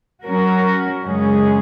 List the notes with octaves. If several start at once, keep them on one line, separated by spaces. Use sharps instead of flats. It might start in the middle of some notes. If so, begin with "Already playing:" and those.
F#3 C#4 F#4 A#4
F#2 C#3 G#3 C#4 G#4